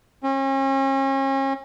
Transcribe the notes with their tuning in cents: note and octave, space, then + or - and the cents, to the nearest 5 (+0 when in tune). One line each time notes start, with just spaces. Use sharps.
C#4 -40